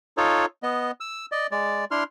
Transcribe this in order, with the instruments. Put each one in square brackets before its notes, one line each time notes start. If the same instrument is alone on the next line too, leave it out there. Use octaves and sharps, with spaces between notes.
[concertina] D#4 F4 A4 C#5
B3 D#5
E6
D5 D#5
G#3 D5
D4 E4 C6 F6